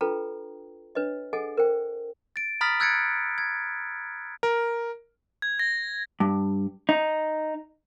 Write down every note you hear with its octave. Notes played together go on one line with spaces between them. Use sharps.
D4 F4 A4 B4 G5 A#5
D4 B4 C#5 D#5
G#4 A4 D#5 F#5 G#5
A#4 C5 G5
A6 D7
A#5 B5 D#6 F6 A6 B6
E6 F#6 G#6 A6 C#7 D7
G#6
A#4
G#6
A#6
G2
D#4